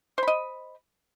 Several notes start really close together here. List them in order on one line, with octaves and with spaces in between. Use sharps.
C5 B5 D#5